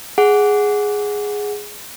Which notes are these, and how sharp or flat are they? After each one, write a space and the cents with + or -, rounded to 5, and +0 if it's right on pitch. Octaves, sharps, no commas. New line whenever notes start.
G#4 +0 F#5 +0